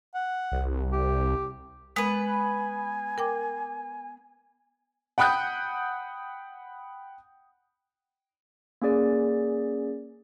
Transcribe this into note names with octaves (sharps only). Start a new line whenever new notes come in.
F#5
C2
G4
G#3 B3 B4 G#5
A#4 G5 D6
F#5 G5 B5 D#6 F#6 G6
A#3 C#4 G#4 D5